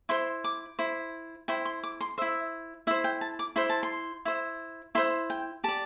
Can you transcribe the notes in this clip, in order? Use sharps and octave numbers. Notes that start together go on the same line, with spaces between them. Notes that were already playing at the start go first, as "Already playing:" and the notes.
E4 C5 C6
D6
E4 C5
E4 C5 G5
C6
D6
C6
E4 C5 E5
E4 C5 E5
G5
A5
D6
E4 C5 C6
A5
C6
E4 C5
E4 C5 C6
G5
G4 D5 A5